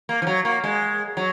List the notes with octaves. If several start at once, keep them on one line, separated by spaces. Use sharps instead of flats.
A#3
F3
F#3
A#3
G#3
F#3